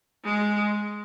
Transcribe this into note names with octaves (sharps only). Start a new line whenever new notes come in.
G#3